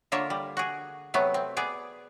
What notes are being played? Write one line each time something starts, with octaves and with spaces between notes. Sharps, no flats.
D3 A#3 F4 A#4 C#5 E5
G3
F#4 G#4
C3 F#3 A3 B3
C4
B3 G#4 D5